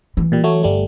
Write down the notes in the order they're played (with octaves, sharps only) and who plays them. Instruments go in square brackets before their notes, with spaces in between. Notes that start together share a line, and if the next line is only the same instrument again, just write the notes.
[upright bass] E3
[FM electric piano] A#2 G3
F#3 A3 C#5
G1 G3 A3